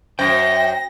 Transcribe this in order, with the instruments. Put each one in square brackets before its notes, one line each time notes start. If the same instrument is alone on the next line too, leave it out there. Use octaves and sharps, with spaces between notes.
[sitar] F#2 [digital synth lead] C5 [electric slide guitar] G5 [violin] A#6